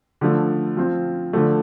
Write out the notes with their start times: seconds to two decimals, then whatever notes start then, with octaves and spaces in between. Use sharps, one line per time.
0.21 D3 F3 A3
0.77 F3 C4 F4
1.33 D3 F3 A3